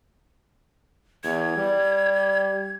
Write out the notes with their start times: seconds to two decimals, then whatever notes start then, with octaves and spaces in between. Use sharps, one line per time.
1.24 E2 G#6
1.57 G3